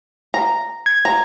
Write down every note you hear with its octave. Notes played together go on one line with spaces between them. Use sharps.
A#5
G#6
A#5